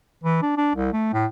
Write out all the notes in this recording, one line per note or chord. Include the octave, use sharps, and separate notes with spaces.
E3
D4
D4
C2
A3
A2